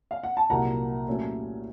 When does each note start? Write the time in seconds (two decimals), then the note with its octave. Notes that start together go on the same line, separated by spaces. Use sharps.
0.11 F5
0.23 F#5
0.37 A5
0.50 C2 A#2 F#3 A#3 F#5 A#5
1.07 A#2 F#3 A3 C#4